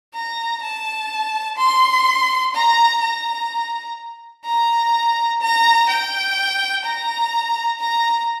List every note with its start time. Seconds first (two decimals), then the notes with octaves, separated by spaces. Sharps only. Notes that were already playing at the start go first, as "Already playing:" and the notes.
0.14 A#5
0.63 A5
1.58 C6
2.54 A#5
3.02 A#5
4.45 A#5
5.41 A#5
5.89 G5
6.85 A#5
7.80 A#5